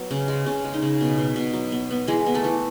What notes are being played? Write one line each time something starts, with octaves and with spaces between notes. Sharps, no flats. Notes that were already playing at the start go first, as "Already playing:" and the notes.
Already playing: F#3 B3
C#3
G#3
C#3 C#4
G#3
D#4
C#3
B2
B2
B2
F#3
B3
B3
E3 G#3 G#4
B3
A3 A4
E3